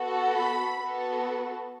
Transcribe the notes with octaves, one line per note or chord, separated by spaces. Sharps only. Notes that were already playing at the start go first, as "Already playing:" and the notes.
Already playing: B3 F#4 A4
B5
B3 F#4 A4